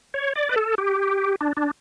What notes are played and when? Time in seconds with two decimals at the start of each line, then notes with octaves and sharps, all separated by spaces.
0.14 C#5
0.36 D5
0.49 B4
0.56 A4
0.78 G4
1.41 D4
1.57 D4